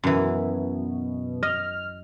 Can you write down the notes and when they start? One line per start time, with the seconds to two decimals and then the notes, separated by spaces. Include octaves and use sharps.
0.03 F#2 B2 E3
1.43 D#5 F6